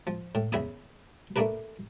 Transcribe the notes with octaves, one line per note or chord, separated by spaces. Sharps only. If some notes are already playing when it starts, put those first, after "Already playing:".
F3
A2
E2 C#3 E4 E5 G#5 D#6
A3 A#3 D4 A#4 B4